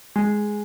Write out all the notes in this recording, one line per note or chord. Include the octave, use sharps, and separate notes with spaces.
G#3